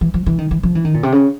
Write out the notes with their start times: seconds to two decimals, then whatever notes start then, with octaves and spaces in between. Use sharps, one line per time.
0.01 E3
0.14 F3
0.26 E3
0.38 D#3
0.51 E3
0.63 F3
0.75 E3
0.85 D#3
0.94 A#2
1.03 C3
1.12 C#3